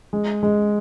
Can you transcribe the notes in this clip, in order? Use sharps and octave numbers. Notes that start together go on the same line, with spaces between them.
G#3
G#3